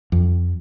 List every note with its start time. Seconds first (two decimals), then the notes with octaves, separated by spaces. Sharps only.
0.12 F2